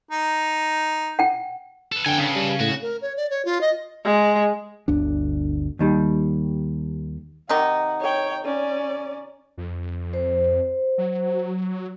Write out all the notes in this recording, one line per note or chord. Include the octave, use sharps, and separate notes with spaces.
D#4
F#5 G5
A4 B4
D3 G5 G#5
C#3
G3
A2 F#4
A#4
C#5
D5
C#5
F4
D#5
G#3
G1 D2 D4
D#2 D#3 G3
C3 D#3 D#4 F#5
C#5 G5
C#4 D5
F2
C5
F#3